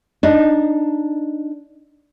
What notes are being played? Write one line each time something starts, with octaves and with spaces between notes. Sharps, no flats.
D4 D#4